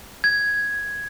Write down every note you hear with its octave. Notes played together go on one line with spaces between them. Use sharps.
G#6